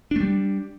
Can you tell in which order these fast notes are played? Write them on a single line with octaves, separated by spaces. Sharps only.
D4 A3 G3